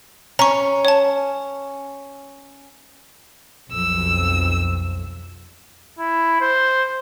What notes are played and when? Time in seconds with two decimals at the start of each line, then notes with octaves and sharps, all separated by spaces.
0.39 C#4 A#5 C#6
0.85 C#5 A5
3.72 B1 F2 E6
5.99 E4
6.41 C5